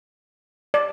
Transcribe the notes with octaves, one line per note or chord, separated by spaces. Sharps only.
D5